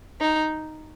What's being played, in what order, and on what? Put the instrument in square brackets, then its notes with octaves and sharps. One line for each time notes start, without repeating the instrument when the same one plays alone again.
[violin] D#4